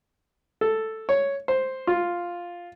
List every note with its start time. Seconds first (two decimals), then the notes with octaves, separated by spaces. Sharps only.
0.61 A4
1.09 C#5
1.48 C5
1.87 F4